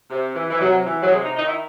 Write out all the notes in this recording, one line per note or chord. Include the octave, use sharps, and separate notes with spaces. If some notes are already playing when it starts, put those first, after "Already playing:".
C3
E3
E3
C3 F#3
E3
F#3
C3 G#3
D#4
D#3 D#4
E4